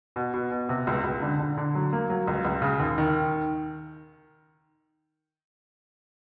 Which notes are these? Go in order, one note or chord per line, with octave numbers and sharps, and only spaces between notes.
B2
B2
B2
C3
C#2
C#2
D3
D3
D3
F#3
A#3
F#3
C#2
C#2
C#3
D#2
D#3